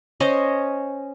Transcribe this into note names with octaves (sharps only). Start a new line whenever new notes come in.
C#4 C5 C#5 D#5